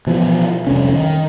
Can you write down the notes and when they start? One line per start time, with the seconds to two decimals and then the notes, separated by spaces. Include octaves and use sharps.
0.07 B2 E3 F3
0.67 F1 C2 D3 C#4
0.93 D#3